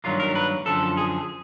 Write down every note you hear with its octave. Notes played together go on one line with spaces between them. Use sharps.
G2 D#3 F#3 A#3 F4
A#4
B4
F#2 D3 F3 A4
G#4